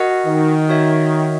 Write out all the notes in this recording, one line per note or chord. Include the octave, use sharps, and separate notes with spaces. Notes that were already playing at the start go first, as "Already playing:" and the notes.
Already playing: F#4 A#4 D#5 F#5
D#3
F#4 C#5 E5